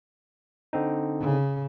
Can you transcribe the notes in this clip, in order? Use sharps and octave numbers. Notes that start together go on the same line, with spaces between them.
D3 C4 D#4
C#3